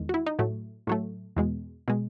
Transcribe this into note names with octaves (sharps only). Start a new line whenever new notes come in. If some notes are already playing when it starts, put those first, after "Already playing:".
Already playing: E2 D#3 G#3
F#4
E4
D#4
A2 F#3 A3
A2 F#3 A3
E2 B2 G#3
B2 G#3